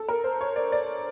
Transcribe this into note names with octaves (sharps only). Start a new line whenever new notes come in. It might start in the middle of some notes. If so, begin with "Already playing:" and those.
Already playing: A4
A#4
C5
C#5
D5
D5